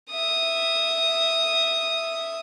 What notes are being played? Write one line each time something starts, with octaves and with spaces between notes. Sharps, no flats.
E5 D#6